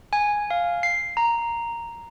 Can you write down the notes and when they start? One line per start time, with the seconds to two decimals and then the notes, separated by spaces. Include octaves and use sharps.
0.13 G#5
0.50 F5
0.83 C7
1.17 A#5